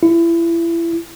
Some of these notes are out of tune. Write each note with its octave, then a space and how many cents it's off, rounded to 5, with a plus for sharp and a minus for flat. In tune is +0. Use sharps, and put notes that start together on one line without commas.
E4 +30